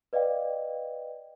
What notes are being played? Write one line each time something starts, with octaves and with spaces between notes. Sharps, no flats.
B4 D5 D#5 F5 G5